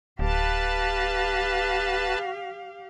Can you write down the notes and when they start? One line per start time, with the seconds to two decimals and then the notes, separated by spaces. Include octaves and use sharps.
0.19 D1 G4 B4 F5 A5